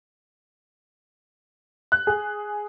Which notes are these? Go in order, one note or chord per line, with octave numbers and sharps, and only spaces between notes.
F#6
G#4